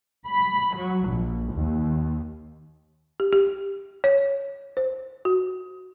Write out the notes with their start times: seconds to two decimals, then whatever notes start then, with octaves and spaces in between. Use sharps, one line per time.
0.25 B5
0.74 F#3
1.03 A#1
1.51 D#2
3.20 G4
3.33 G4
4.04 C#5
4.77 C5
5.25 F#4